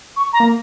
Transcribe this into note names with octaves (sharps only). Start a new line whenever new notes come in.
C#6
A#5
A#3